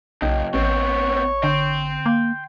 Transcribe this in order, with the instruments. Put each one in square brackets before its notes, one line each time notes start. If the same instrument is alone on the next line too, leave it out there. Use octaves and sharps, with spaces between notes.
[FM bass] B1 [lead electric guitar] F#2 C#3 [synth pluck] D#5 G5
[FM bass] A1 [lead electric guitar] B3 C4 [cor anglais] C#5
[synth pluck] D3 [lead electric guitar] G5 C6
[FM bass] A#3